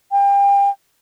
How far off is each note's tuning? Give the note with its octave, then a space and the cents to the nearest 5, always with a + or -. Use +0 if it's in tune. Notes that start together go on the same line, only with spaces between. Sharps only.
G5 +35